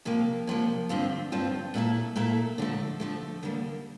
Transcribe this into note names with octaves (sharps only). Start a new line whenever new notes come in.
C3 F3 A#3
C3 F3 A#3
G2 D3 F3 C4 F4
G2 D3 F3 C4 F4
A#2 A3 E4 A4
A#2 A3 E4 A4
D3 F3 A3
D3 F3 A3
E2 D3 G3 A#3